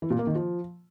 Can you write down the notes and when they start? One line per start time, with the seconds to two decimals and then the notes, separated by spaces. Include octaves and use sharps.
0.02 E3
0.10 A#2
0.19 A#3
0.27 D#3
0.35 F3